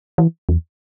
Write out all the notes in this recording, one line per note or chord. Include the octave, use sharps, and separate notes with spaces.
E3
E2